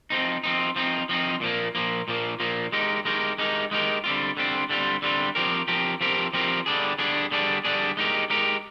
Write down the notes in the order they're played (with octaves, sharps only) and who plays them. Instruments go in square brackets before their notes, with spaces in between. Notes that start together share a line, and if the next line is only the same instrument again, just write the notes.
[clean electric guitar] F3 C4 D#4
F3 C4 D#4
F3 C4 D#4
F3 C4 D#4
A#2 F3 A#3
A#2 F3 A#3
A#2 F3 A#3
A#2 F3 A#3
G#3 D#4 G4 A#4
G#3 D#4 G4 A#4
G#3 D#4 G4 A#4
G#3 D#4 G4 A#4
D3 G3 C4 F4
D3 G3 C4 F4
D3 G3 C4 F4
D3 G3 C4 F4
F3 C4 G4 A#4
F3 C4 G4 A#4
F3 C4 G4 A#4
F3 C4 G4 A#4
D3 G3 D4 G#4
D3 G3 D4 G#4
D3 G3 D4 G#4
D3 G3 D4 G#4
G#3 D#4 G4 A#4
G#3 D#4 G4 A#4